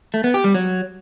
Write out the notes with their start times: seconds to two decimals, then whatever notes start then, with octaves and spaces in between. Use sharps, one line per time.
0.14 A3
0.24 B3
0.34 G4
0.44 G3
0.54 F#3